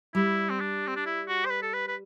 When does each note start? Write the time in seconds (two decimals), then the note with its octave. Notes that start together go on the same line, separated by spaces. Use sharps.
0.15 G3 E4
0.50 C4
0.60 D4
0.87 C4
0.96 D4
1.06 E4
1.28 F#4
1.45 C5
1.50 B4
1.62 A4
1.74 B4
1.88 B4